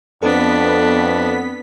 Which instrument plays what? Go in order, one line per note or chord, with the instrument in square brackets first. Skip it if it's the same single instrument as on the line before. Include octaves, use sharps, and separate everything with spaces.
[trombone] F2 [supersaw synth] B3 B6 [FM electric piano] C4 A4 [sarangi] D4